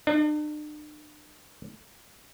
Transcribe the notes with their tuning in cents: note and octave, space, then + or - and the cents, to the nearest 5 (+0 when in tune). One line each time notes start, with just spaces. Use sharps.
D4 +45